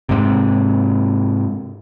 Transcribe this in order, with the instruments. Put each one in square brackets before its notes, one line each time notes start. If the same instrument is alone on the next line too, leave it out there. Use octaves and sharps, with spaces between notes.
[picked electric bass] G#2 C3